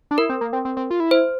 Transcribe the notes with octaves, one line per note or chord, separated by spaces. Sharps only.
D4
E4 A#4
C4
A#3
C4
C4
C4
F4
E4
C5